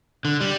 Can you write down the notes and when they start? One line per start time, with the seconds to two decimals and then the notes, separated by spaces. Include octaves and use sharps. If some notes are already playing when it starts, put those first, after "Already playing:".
0.25 D3
0.41 G3